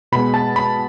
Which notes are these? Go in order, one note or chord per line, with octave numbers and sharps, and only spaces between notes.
B2 G#3 B5
A5
B5